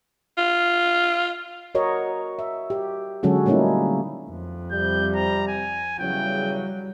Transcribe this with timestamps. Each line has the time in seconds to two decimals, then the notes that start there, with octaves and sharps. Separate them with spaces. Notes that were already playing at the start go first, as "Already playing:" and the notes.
0.37 F4
1.75 F#4 A#4 C#5 D#5
2.39 E5
2.70 G4
3.23 D3 F#3 G#3 C#4 F#4 A4
3.46 G3 A3 A#3 C#4 D#4 E4
4.30 F2
4.71 C3 G3 G6
5.15 A#5
5.48 G#5
5.99 E2 C#3 F#3 G3 G5